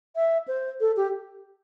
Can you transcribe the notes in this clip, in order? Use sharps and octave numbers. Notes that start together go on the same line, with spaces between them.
E5
C5
A4
G4